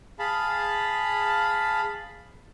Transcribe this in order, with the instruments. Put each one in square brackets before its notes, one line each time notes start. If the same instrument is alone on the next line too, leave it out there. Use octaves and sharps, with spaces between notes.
[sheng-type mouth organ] G#4 F5 A5 B5